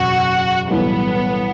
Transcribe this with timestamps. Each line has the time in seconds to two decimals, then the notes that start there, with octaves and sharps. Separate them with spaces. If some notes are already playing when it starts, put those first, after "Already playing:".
Already playing: F#1 E2 B2 F#4
0.71 B1 A2 E3 G3 B3